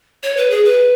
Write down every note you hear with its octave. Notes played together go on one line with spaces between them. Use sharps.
C#5
B4
G#4
B4